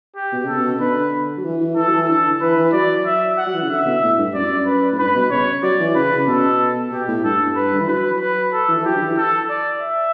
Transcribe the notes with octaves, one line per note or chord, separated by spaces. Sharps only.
G4
B2
C#3 A4
B2
D3 B4
F#3
E3
E3
E3 A4
F#3
E3
D3 A4
E3 B4
E3
F#3 D5
E5
F#5
F#3
E3
C#3
D3 E5
B2
A2
G2
F#2 D5
B4
A2
G2 B4
B2
C#3 C#5
F#3 D5
E3
C#3 B4
C#3
B2 A4
B2 G4
A2
G2 A4
B4
D3
E3
F#3 B4
B4
A4
E3
E3
F#3 G4
D3
E3
A4
D5
E5